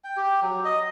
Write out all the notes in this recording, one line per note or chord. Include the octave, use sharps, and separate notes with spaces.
G5
G4
F#3
D#5